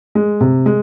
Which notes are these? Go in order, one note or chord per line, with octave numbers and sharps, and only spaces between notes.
G#3
C3
G#3